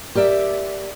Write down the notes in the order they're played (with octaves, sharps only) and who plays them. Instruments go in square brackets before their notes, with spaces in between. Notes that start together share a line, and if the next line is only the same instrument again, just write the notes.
[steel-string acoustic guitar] G4 A#4 D5 E5